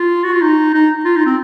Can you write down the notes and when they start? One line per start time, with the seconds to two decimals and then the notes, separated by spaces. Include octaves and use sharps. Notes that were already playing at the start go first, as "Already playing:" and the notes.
Already playing: F4
0.24 F#4
0.33 F4
0.42 D#4
0.74 D#4
1.05 F4
1.16 D#4
1.26 C4